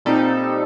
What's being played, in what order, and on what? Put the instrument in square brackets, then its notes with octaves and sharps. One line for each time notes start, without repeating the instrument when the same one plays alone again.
[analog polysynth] A#2 G3 C4 D#4 A4